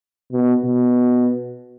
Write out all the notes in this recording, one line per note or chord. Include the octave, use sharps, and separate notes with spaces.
B2
B2